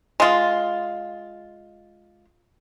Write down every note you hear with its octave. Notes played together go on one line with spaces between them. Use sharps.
G#3 F4